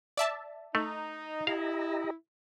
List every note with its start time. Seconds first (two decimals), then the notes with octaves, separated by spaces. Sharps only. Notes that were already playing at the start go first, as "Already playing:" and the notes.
0.17 D5 E5 A5
0.75 A3 D#4
1.47 E4 G4 D#5 F5 A#5